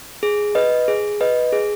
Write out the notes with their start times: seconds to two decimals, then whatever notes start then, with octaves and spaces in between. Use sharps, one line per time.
0.23 G#4
0.55 B4 D#5
0.88 G#4
1.21 B4 D#5
1.53 G#4